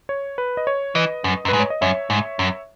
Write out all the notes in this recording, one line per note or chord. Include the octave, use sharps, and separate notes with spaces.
C#5
B4
D#5
C#5
E3 B4 D#5
F#2
F#2
G#2 B4
C#5
D#5
F#2 C#5 E5
G#2
F#2